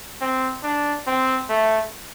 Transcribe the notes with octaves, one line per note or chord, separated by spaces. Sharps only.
C4
D4
C4
A3